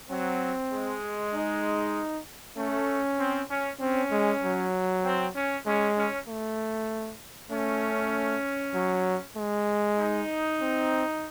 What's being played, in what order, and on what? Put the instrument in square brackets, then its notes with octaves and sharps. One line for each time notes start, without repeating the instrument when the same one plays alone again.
[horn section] F#3 [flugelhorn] C4
[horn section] G#3
[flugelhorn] D#4
[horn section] A3 [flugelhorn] C#4
[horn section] C4
C#4
[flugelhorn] C4 [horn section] C#4
[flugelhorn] G#3
F#3
[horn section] C4
C#4
[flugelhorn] G#3 [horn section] C#4
[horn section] C#4
[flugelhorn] A3
[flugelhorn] A3 [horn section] C#4
[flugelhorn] F#3
G#3
[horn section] D#4
[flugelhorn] C4